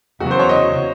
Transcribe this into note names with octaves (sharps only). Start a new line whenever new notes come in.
E2 C#3 F#3 F#4
C5
C#5
D#5